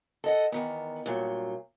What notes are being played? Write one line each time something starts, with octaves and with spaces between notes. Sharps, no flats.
A4 D#5 F#5
E2 D#3 B3
G2 A#2 F#3